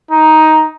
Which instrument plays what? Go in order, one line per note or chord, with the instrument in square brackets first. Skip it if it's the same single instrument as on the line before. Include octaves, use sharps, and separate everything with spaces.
[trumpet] D#4